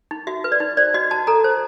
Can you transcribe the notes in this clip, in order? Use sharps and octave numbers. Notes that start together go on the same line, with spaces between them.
D#4
F#4 E5
B4
D5
D#4
C5 D5
F#4 D#5
F#4 A5
A4 A#5
C5